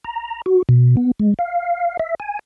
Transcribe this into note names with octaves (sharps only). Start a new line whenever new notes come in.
A#5
F#4
B2
B3
G#3
F5
E5
G#5